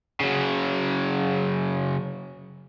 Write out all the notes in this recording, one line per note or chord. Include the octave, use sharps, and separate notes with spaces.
C#3 F#3